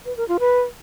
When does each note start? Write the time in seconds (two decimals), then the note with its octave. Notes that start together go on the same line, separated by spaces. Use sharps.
0.06 B4
0.17 A#4
0.28 F4
0.40 B4